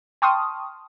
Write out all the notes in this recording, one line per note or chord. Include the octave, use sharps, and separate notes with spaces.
G5 A5 C6 C#6 D#6 F6